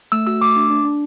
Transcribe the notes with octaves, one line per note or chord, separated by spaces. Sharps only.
A3 E6
F#4 E6
A3 D6
D4
D4
D4